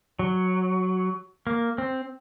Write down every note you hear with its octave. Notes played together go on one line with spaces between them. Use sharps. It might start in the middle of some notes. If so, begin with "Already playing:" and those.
F#3
A#3
C4